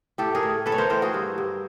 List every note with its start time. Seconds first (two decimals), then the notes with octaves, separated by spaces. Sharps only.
0.18 A2 G4 A4
0.35 G#4 A#4
0.43 A2
0.66 E3 A4 B4
0.72 C#5
0.78 A#4 C5
0.90 A2 A#4 C5
1.02 F#4 G#4
1.14 G2
1.38 G2